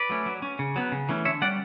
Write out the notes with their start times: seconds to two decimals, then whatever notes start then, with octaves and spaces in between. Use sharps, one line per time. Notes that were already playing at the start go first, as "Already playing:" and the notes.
Already playing: B4 D5
0.09 F#3 A3 C#4
0.26 F#3
0.42 C#4
0.59 C#3
0.76 F#3 B3
0.92 C#3
1.09 E3 A3 C#4
1.25 D3 C#5 E5
1.42 G3 C#4 D5 F#5